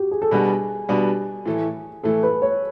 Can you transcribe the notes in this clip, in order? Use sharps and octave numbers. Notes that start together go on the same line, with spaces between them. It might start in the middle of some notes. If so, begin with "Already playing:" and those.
Already playing: F#4 G4
G#4
A4
B2 G3 B3 D4 F#4 G#4
B2 G3 B3 D4 F#4
A2 E3 A3
A2 E3 A3 A4
B4
C#5